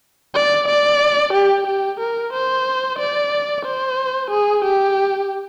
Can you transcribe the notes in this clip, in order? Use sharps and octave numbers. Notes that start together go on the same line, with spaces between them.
D5
D5
G4
G4
A#4
C5
D5
C5
G#4
G4